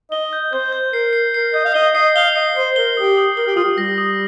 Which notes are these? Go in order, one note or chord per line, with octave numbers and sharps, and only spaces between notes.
D#5 G7
G6
C5 G6
G6
A#4 C7
C7
A#4 C7
D#5 G6
F5
D#5 G7
D#5 C7
F5 G7
D#5 C7
C5 C7
A#4 G7
G4 D#6
D#6
A#4 G7
G4
F4 D#6
G4
G3 A#6
D#6